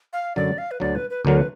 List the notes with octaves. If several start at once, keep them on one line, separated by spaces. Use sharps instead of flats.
F5
F#2 D3 F#3 D5
F5
B4
D2 D3 F#3 D5
B4
B4
D2 D3 F#3 A#4
B4